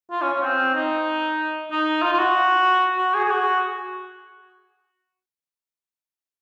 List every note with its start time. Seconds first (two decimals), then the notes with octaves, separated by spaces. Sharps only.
0.11 F4
0.22 C#4
0.33 C#4
0.43 C4
0.74 D#4
1.71 D#4
2.02 F4
2.13 F4
2.19 F#4
2.98 F#4
3.14 G#4
3.25 G#4
3.31 F#4